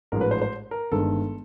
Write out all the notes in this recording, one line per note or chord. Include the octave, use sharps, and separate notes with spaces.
A1 G#2 F3 G#3 A#4
B4
C5
C5
A#4
G1 G2 D#3 G#3 A4